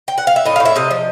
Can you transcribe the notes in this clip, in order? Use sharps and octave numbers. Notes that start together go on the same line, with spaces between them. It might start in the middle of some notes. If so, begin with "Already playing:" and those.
G5
F#5
F5
E5
A2 D#5
F5
A2
E5
C3 D#5
F3